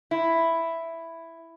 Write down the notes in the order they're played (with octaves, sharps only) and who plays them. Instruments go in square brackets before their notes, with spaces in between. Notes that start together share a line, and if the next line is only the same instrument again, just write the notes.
[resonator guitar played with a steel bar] E4